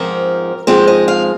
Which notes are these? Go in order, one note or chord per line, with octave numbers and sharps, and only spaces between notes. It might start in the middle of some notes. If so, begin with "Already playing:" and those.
Already playing: G#2 F3 C4 A#4
G#2 F3 G#3 C4 C5
D#5
F5